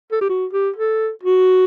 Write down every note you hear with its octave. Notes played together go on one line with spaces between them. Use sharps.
A4
G4
F#4
G4
A4
F#4